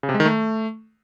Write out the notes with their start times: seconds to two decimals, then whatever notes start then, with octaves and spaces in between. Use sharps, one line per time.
0.03 C#3
0.09 C3
0.14 G#3
0.20 D#3
0.25 A3